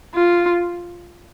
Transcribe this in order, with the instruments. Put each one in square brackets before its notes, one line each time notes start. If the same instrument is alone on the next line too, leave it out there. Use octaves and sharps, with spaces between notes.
[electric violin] F4